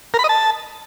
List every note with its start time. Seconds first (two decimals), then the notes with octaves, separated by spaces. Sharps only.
0.14 A#4
0.19 B5
0.24 D#5
0.29 A5